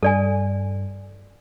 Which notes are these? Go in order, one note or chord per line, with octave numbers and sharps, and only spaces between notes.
G2 A4 D5 G#5